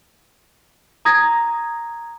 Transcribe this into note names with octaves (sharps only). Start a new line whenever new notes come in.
A#5 D#6 G#6 A#6